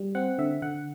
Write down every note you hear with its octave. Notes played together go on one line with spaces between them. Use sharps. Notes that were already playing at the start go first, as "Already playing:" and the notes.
Already playing: G3
C4 F#5
D3 E5
D3 F#5